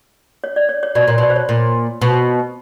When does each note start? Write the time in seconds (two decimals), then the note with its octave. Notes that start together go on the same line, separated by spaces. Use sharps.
0.44 C#5
0.56 D5
0.69 C#5
0.83 C#5
0.95 B2 D5
1.08 A#2 C#5
1.18 B2 D5
1.30 C5
1.36 C#5
1.49 A#2
2.02 B2